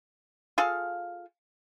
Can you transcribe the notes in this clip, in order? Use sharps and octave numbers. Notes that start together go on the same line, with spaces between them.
F4 G#4 A4 F5